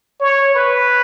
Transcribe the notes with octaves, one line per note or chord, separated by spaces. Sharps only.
C#5
B4